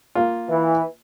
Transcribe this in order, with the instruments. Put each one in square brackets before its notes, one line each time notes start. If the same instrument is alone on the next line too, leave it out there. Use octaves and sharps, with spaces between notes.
[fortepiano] A#3 F4
[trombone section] E3